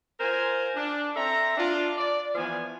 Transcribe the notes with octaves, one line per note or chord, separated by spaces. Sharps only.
F4 A#4 C5 G#5
D4
C4 A4 E5 A#5
D4 F4
D5
E3 F3 B3 G#5